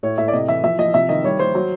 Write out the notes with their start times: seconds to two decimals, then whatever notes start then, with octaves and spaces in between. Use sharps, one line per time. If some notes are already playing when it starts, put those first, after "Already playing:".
0.03 A2 C#5
0.18 A2 E5
0.28 D5
0.33 C3 D#5
0.48 E3 E5
0.64 F3 E5
0.78 F3 D#5
0.94 C3 E5
1.09 D#3 D#5
1.24 G3 C#5
1.39 G3 C5
1.55 F#3